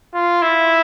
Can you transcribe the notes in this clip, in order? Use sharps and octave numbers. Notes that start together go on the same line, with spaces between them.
F4
E4